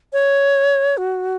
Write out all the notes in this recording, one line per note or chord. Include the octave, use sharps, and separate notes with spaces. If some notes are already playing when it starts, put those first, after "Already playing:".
C#5
F#4